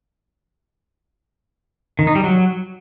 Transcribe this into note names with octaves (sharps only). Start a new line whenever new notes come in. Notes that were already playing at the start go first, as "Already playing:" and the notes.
D#3
D#4
G3
F#3